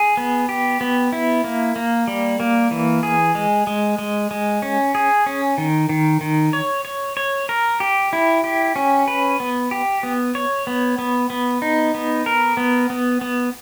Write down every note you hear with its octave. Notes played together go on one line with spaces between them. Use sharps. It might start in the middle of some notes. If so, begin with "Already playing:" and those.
Already playing: G#4
B3
G4
B3
E4
A#3
A#3
G3
A#3
E3
G#4
G#3
G#3
G#3
G#3
C#4
G#4
C#4
D#3
D#3
D#3
C#5
C#5
C#5
A#4
G4
E4
G4
C#4
B4
B3
G4
B3
C#5
B3
B3
B3
D#4
B3
A#4
B3
B3
B3